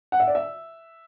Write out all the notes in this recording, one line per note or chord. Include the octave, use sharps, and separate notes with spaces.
F#5
E5
D5
E5